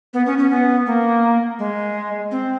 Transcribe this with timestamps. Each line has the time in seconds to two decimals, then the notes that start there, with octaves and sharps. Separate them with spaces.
0.14 B3
0.26 C#4
0.38 C#4
0.51 B3
0.86 A#3
1.59 G#3
2.31 C4